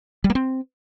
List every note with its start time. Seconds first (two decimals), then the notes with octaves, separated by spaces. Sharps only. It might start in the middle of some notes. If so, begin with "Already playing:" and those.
0.24 G3
0.30 A#3
0.35 C4